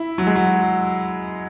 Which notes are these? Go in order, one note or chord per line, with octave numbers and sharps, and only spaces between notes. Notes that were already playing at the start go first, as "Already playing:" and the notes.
Already playing: E4
F#3
G#3
F#3